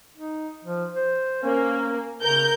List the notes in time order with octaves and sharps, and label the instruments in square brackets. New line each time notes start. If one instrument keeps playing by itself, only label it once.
[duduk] D#4
F3
C5
[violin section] A#3 [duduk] C#4
[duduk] C#3 [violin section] A#4 G6